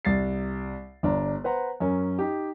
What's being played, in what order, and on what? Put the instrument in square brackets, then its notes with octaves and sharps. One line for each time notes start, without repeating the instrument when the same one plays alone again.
[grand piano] C2 A6 C7
G1 D4 A#5
B4 C5 F#5 A#5
F#2 C#4 A#4
D#4 G4